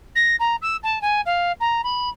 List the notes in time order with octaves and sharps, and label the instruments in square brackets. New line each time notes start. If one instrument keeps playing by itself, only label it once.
[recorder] A#6
A#5
E6
A5
G#5
F5
A#5
B5